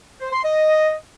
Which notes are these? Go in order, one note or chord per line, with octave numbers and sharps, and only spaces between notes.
C5
C6
D#5